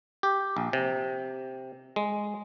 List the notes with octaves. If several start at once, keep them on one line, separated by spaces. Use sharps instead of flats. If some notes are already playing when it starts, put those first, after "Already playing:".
G4
A#1
C3
G#3